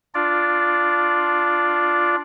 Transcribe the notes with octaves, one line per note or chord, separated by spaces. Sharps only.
D4 F4 D5